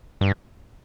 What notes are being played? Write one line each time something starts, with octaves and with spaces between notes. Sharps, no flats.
G2